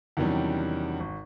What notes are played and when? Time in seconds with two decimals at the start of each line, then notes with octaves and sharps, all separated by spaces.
0.17 E2 C3 D#3 F#3 G3 C#4
1.00 G#1